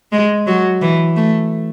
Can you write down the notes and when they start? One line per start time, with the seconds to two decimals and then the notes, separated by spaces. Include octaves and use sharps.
0.12 G#3
0.47 F#3
0.82 E3
1.16 A3